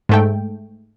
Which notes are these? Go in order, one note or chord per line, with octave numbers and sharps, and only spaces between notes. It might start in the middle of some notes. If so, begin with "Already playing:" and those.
G#2 A3 G5